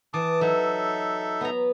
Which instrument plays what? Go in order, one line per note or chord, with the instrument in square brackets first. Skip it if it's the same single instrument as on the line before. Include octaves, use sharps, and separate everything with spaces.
[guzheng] E3 [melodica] A5 D6 D#6
[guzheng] F#3 [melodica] D#4 A4 E5
[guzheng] B3 A#5